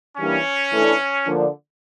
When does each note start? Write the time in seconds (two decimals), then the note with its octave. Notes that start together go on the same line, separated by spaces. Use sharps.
0.17 E3 G3 A#3 C#4 D4
0.72 E3 A3 D4
1.26 D3 F3 A#3 D4